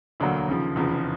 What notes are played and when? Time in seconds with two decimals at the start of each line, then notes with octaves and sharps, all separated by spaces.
0.20 E1 D2 D3 F#3 A#3
0.48 D#2 C#3 F3
0.76 F1 E2 C#3 F3